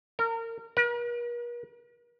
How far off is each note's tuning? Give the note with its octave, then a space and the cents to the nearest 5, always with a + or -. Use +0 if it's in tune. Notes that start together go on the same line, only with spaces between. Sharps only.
A#4 -30
A#4 +45